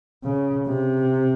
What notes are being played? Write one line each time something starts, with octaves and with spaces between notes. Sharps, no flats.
C#3
C3